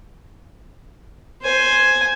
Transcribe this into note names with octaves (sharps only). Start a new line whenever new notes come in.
C5 G#5